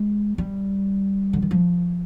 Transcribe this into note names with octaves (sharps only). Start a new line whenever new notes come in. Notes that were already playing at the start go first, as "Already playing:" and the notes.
Already playing: G#3
G3
D3
D#3
F3